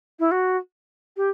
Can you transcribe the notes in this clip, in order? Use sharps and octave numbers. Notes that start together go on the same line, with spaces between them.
E4
F#4
G4